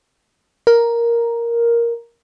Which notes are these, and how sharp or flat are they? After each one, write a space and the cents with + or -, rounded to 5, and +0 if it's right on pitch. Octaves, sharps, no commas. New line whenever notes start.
A#4 +5